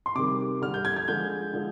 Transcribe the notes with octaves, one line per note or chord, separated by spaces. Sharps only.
C6
C3 D#3 G3 D6
D3 G3 F6
G6
G#6
G#6
D3 F3 G#3 G6
D3 F3 G#3